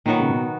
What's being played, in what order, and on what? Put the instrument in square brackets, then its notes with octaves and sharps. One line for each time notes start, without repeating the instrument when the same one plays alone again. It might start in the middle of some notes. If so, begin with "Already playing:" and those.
[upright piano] A#2 [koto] D#3 F#3 B3 F#4
[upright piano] C#3
B2